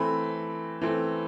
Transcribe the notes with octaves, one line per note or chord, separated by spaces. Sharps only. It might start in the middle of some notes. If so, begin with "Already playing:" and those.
Already playing: E3 A3 C4 B5
E3 A3 C4